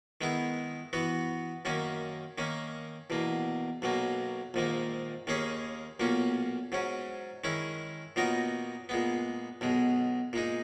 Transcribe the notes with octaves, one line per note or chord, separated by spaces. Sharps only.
D#3 G#3 B3 E4
E3 B3 F#4
F#2 D#3 A#3 C#4
D#3 A#3 C#4
E2 B2 A#3
B1 B2 F#3 A#3
A#1 G#2 D#3 A#3
D#2 D#3 A#3 C#4 G#4
B1 A#2 A#3 C#4
G#2 F#3 C#4
D#3 G#3 C#4 E4
A#2 F#3 B3 D#4 A#4
A#2 G#3 B3
B1 B2 G#3
A#2 G#3 D#4